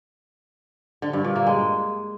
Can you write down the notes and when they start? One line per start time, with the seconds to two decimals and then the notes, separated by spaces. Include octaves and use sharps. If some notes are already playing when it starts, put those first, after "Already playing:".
1.02 D3
1.13 G2
1.24 A#2
1.36 A#3
1.47 G#3